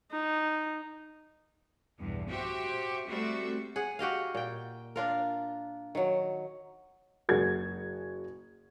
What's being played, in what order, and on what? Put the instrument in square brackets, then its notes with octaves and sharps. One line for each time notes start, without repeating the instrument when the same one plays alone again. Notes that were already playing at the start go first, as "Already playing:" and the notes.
[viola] D#4
[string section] B1 E2 G2
F#4 G4 C5 E5
G3 A3 C4 F#4 E5
[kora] G#4 F#5
F#4 G4 D#5 F5
A#2 G5
D4 F4 A#4
D#3 F#3
[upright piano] F#1 G#3 F#4 G#6